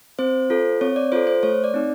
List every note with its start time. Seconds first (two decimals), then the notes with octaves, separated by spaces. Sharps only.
0.19 C4 C5
0.50 F4 A4
0.81 C4 C#5
0.96 D5
1.12 F4 A4 C5
1.27 C5
1.43 A3 C#5
1.64 D5
1.74 C4 D#4